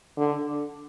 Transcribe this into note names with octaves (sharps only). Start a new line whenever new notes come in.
D3